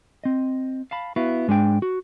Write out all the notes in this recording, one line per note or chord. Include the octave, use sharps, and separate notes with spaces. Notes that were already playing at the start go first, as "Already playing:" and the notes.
C4 D#5
F5 A5 B5
B3 E4 F#4 F5
G#2 G#3 D4 A4 G5
F#4